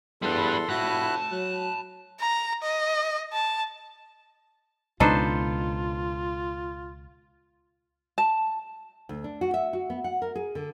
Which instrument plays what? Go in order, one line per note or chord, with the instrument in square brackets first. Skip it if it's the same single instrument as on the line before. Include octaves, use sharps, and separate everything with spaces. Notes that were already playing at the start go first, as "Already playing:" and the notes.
[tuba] E2 [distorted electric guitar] G3 B4 [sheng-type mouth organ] A4 C6
[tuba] F1 [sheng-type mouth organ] E4 F#4 F#6 [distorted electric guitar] A5 B5
[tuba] F#3 [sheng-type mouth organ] F#6
[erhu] A#5
D#5
A5
[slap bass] C#2 B2 [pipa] D4 D#4 [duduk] F4 [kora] A4 B4 C5
[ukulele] A5
[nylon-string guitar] D2
D4
F#4
E5
F#4
B3
F#5
A#4
G#4
D3